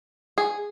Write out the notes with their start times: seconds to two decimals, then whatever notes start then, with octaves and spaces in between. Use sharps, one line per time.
0.38 G#4